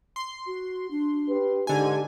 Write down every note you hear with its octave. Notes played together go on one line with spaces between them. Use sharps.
C6
F#4
D4
G4 B4
G#2 D3 G4 G#5